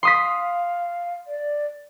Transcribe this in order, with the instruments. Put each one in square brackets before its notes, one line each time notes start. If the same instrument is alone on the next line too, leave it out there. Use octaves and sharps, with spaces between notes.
[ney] F5 [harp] C6 D#6 B6
[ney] D5